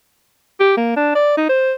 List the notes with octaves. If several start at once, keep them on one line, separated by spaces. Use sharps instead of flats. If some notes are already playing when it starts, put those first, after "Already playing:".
G4
A#3
D4
D5
D#4
C5